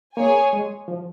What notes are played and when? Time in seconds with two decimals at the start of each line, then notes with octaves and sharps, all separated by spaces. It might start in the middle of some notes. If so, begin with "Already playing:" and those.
0.17 A#3 G#4 C#5 G#5
0.53 G#3
0.88 F3